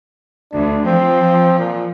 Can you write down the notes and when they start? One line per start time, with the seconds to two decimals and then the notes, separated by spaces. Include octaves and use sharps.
0.52 D2 D4
0.85 F3 C4
1.58 A#2